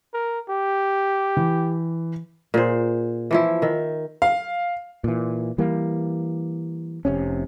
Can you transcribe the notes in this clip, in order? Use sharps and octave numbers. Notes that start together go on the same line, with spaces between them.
A#4
G4
E3
A#2 G#4 C5
E3 F3 E4
D#3 E5
F5
A#2 E3
E3 G3 A#3
F1 C3 C#4